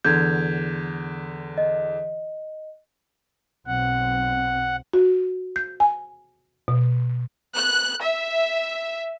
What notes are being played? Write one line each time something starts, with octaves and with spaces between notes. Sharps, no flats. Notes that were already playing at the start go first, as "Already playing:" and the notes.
E2 D3 G6 G#6
D#5
B1 C4 F#5
F#4
G6
G#5
B2
F#6
E5